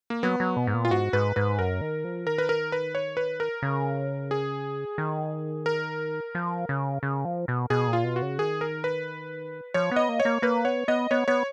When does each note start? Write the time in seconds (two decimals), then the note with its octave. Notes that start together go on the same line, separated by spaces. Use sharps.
0.10 A#3
0.23 F#3 B3
0.40 F#3
0.57 B2
0.67 G#2
0.74 A#2
0.85 F4
0.91 G#2 F#4
1.13 G#2 B4
1.36 G#2 B4
1.59 F#2 A#4
1.81 D#3
2.04 F3
2.27 D#3 A#4
2.38 B4
2.49 A#4
2.72 B4
2.95 C#5
3.17 B4
3.40 A#4
3.62 C#3
4.31 G#4
4.98 D#3
5.66 A#4
6.35 F3
6.69 C#3
7.03 C#3
7.25 F3
7.48 B2
7.70 B2 G#4
7.88 A#2
7.93 F4
8.04 B2
8.16 F#4
8.22 C#3
8.39 D#3 G#4
8.61 A#4
8.84 B4
9.74 F3 C#5
9.91 B3 D#5
10.09 A#3
10.20 C#5
10.25 A#3
10.42 A#3 B4
10.65 B3 C#5
10.88 B3 D#5
11.11 B3 C#5
11.28 B3 C#5